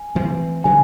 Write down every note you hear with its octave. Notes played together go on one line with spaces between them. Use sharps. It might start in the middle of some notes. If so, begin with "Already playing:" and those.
Already playing: G#5
E3 A3 C4
C#3 F3 G#3 C4 G#5